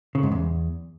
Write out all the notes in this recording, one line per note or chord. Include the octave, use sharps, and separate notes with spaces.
C#3
G#2
E2